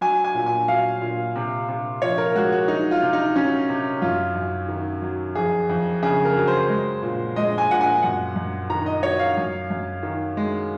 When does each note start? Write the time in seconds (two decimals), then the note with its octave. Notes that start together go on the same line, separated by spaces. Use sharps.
0.01 F#3 G#5
0.24 G#5
0.34 A#2
0.46 G#5
0.68 F#3 F5
1.02 A#2
1.36 C3
1.68 C3
2.02 F3 C#5
2.18 A#4
2.35 G#3 F#4
2.52 F#4
2.68 F#3 D#4
2.91 F4
3.03 C3
3.13 D#4
3.36 F#3 C#4
3.69 C3
4.02 F#2 F4
4.35 F#2
4.68 D#3
5.02 F#3
5.35 F2 G#4
5.69 F2
6.03 C#3 G#4
6.25 A#4
6.36 F#3
6.47 C5
6.69 G#3
7.02 A#2
7.36 G#3 D#5
7.58 G#5
7.70 A#2 F#5
7.81 G#5
8.02 F#2 F#5
8.36 F#2
8.70 D#3 A#5
8.86 D#5
9.03 F#3 C#5
9.19 F5
9.37 F#2
9.70 F#2
10.03 D#3
10.37 G#3